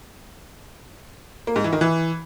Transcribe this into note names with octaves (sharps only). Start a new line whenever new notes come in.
A#3
G#2
E3
D#3
E3